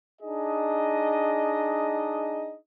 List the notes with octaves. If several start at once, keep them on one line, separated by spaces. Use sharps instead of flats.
D4 D#4 G#4 D#5